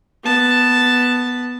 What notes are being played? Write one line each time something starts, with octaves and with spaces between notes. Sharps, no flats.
B3 A5